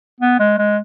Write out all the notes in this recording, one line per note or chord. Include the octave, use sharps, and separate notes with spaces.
B3
G#3
G#3